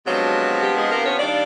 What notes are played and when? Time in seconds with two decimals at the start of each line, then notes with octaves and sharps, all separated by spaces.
0.06 C3 F3 F#3 G#3 B3 D4 F#4
0.63 G3 G4
0.77 G#3 G#4
0.91 A#3 A#4
1.05 C#4 C#5
1.19 D#3 G3 A#3 D4 D5